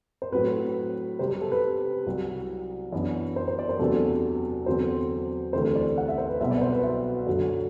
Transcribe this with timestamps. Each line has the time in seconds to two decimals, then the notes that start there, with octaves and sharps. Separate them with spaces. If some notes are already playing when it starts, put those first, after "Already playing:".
0.22 C5
0.32 A2 F#3 C4 B4
1.19 C3 G3 C4 C5
1.30 G4
1.41 A4
1.52 B4
2.06 C2 C3 F#3
2.93 F#2 E3 B3 D4
3.36 C5
3.48 C5
3.59 D5
3.69 C5
3.79 E2 C3 F#3 A3 D4 A4
4.66 E2 D3 F#3 C4 C5
5.53 D2 C3 E3 A3 C5
5.65 C5
5.76 D5
5.97 F#5
6.08 E5
6.18 C5
6.29 B4
6.40 C2 B2 F#3 B3 E5
6.51 D5
6.61 C5
6.73 B4
6.83 E5
7.27 F#2 D3 F#3